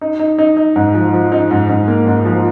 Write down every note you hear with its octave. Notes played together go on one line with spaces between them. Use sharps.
D#4
D#4
D#4
D#4
G#2
F3
F3
D#4
G#2
G#2
A#3
G#2
F3